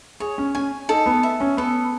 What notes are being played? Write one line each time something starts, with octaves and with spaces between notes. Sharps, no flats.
G#4 C#5
C#4
C#4 G#5
D#4 A4
B3
E5
C#4
B3 A4